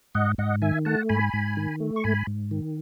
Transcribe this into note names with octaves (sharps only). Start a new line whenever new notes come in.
G#2 D#5 F#5
G#2 D#5 F#5
D#3 E5 G#5
A3 F#5 A5
G#2 G#5 B5
G#2
D#3
A3
C#6
G#2 G#5 B5
G#2
D#3